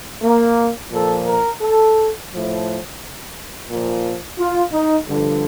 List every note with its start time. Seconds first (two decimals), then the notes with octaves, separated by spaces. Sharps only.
0.21 A#3
0.91 A#2 F3 A4
1.26 A#4
1.60 A4
2.30 A2 F3
3.69 A#2 F3
4.37 F4
4.72 D#4
5.07 G2 D3 F3